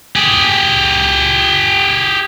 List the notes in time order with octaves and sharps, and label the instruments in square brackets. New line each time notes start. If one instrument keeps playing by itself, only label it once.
[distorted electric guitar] G4 G#4